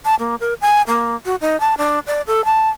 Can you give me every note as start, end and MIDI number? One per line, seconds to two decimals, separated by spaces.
0.05 0.15 81
0.19 0.35 58
0.40 0.54 70
0.61 0.82 80
0.88 1.15 58
1.25 1.35 66
1.41 1.59 63
1.60 1.75 81
1.78 1.99 62
2.07 2.22 74
2.27 2.44 69
2.45 2.69 81